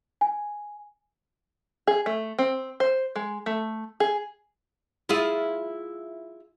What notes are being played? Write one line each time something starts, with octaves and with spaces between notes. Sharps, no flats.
G#5
G#4
A3
C4
C5
G#3
A3
G#4
E4 F4 G#4